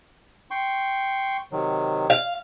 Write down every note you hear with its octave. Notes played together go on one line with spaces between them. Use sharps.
G5 C6 C#6
C3 D#3 F#3
F5